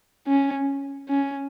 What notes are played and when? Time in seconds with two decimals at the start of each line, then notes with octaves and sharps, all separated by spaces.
0.27 C#4
1.09 C#4